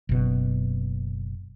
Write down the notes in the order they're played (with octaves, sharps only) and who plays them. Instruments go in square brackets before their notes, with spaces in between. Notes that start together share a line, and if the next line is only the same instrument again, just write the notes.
[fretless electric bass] F#1 B2